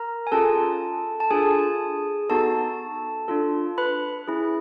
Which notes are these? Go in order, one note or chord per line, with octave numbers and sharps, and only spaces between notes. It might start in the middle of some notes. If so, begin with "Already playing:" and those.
Already playing: A#4 A#5
G#5
C#4 F4 G#4 A4 A5
A5
D4 F4 G#4 A4 G#5
B3 D#4 F#4 A4 A5
D4 F4 A4
B4 B5
C#4 E4 G#4